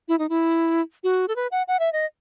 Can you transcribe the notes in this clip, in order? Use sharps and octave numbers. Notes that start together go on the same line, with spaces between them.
E4
D#4
E4
F#4
A4
B4
F#5
F#5
E5
D#5